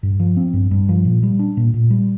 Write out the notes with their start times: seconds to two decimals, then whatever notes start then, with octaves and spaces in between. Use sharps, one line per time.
0.03 G2
0.20 F3
0.37 C4
0.53 G2
0.71 G2
0.89 F3
1.05 A#2
1.23 G3
1.39 D4
1.57 A#2
1.74 A#2
1.90 G3